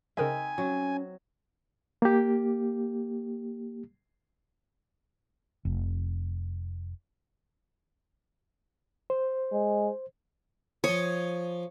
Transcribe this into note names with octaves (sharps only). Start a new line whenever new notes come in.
C#3 C4 D#4 A#4 D#5 E5 G#5
F#3 C#4
A#3 G4
F1
C5
G#3
F3 C#5 G#5 D#6